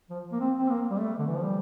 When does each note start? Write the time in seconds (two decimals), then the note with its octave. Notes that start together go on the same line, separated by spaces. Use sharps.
0.10 F3
0.32 A#3
0.40 C4
0.59 C4
0.69 A#3
0.90 G3
0.99 A3
1.19 D3
1.27 E3
1.35 F3
1.43 G3